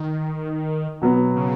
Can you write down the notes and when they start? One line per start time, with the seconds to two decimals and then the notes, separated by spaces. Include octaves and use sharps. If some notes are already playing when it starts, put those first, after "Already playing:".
Already playing: D#3
1.02 B2 F#3 B3
1.36 C#3